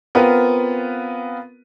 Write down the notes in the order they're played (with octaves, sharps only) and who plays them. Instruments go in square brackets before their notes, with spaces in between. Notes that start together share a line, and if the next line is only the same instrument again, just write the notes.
[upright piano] B3 C4 F4 A#4 B4